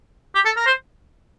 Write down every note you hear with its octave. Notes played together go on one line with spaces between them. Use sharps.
G4
A4
A#4
C5